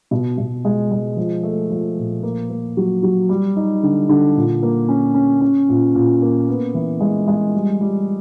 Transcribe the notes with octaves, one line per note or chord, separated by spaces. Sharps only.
B2
B2
G#3
G#3
F3
A3
F3
A#2
A#3
A#3
F#3
F#3
G3
D#4
D3
D3
A#2
A#3
C#4
C#4
C#4
A#2
A#2
A#3
B3
E3
G#3
G#3
G3
G3